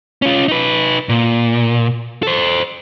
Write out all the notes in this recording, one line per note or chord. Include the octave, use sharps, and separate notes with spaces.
C#4 F4
D#4 B4
A#2
A4 C5